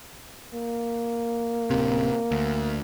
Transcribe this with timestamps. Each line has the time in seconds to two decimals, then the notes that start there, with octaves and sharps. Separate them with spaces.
0.54 A#3
1.70 D1 C3
2.31 D2